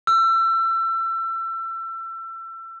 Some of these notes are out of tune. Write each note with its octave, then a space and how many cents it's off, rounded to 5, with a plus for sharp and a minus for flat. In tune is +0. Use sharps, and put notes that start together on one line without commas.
E6 +30